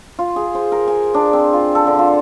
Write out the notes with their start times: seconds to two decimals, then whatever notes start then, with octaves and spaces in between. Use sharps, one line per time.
0.19 F4
0.36 G#4
0.55 C5
0.72 A#4
0.88 G#5
1.14 D4
1.33 C4
1.53 F4
1.75 A4
1.87 D3
1.99 F4